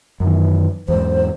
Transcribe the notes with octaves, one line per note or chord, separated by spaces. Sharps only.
F#2 D#3 E3
E2 G#2 C5